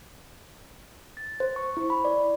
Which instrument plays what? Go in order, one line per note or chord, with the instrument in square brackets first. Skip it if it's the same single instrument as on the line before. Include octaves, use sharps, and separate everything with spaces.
[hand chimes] A6
C5
C#6
E4
B5
D5